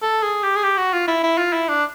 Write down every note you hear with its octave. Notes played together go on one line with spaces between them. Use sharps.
A4
G#4
G4
G#4
G4
F#4
F4
E4
E4
F4
E4
D4